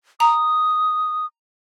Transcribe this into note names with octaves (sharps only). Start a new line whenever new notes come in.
A#5 D#6